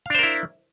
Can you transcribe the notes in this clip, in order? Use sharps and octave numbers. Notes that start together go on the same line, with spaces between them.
D4 E4 A#4 C5 F5